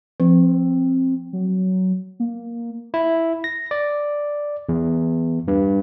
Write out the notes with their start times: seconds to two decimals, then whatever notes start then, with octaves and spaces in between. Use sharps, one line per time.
0.20 F3 C4
1.33 F#3
2.20 A#3
2.94 E4
3.44 A#6
3.71 D5
4.69 E2
5.48 G2